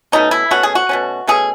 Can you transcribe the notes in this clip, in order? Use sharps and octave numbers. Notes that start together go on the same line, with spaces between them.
B2 A3 C#4 D#4
E4
B2 A3 C#4 F#4
G#4
F#4
B2 A3 C#4
B2 A3 C#4 G#4